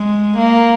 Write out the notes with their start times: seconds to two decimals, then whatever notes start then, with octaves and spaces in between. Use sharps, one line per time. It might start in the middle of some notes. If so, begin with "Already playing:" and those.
Already playing: G#3
0.37 A#3